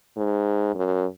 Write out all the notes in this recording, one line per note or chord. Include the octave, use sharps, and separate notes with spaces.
G#2
F#2